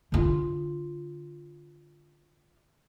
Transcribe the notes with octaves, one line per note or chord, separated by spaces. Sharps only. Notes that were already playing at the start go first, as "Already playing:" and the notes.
D3 F4